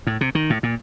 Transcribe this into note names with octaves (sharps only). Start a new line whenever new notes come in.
A2
C3
D#3
A2
A#2